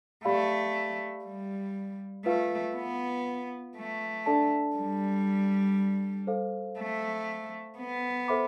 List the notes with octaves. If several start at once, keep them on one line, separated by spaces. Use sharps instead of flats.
A3 G4 D5 F5 B5
G3
A3 F4 B4 F5
B3
A3
D4 A4 D5 A5
G3
A4 C5 F5
A3
B3
A4 C5 E5 B5 D6